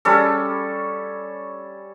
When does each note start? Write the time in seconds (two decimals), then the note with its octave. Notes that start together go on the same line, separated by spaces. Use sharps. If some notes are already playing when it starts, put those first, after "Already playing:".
0.05 G3 C#4 A4